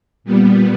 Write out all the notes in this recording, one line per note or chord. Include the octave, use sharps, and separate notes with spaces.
A#2 G3 B3